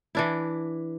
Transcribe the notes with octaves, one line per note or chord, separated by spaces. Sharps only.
E3 D4 E4